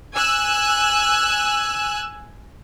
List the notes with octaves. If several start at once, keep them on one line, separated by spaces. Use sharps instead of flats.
G#5 E6 F#6